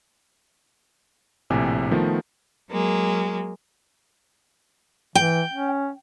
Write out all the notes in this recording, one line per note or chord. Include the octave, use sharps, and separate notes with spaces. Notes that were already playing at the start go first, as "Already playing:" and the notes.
A#1 A2 C3 G4 G#5
D#3 F3 A3 B3
F#3 G#3 A#3
E3 G5
C#4